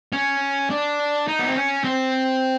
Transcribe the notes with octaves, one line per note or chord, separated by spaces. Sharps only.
C#4
D4
D#4
B3
C4
C#4
C4